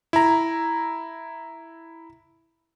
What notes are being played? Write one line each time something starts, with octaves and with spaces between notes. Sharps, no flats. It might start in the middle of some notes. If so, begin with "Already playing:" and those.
E4 A#5